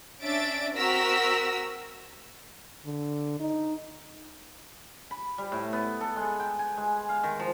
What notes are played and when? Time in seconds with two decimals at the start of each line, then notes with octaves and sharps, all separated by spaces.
0.23 C#4 D4 E5 A6 D7
0.77 C4 F#4 A#4 E6 A#6 B6
2.86 D3
3.40 D#4
5.11 B5
5.38 G3
5.52 A2
5.73 B3
6.01 A4
6.16 G#3
6.40 G5
6.59 G#5
6.77 G#3
7.09 F5
7.24 D#3
7.40 F3